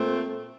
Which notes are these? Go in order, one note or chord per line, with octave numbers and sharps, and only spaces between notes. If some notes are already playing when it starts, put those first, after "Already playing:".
Already playing: A#2 A3 C4